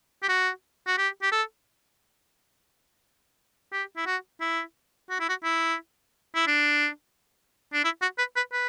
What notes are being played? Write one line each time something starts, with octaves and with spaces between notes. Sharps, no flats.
G4
F#4
F#4
G4
G4
A4
G4
E4
F#4
E4
F#4
E4
F#4
E4
E4
D4
D4
E4
F#4
B4
B4
B4